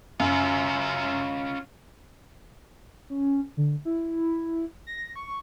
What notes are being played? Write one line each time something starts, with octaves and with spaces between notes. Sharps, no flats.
F#2 C#4 F4
C#4
D3
E4
A#6
C#6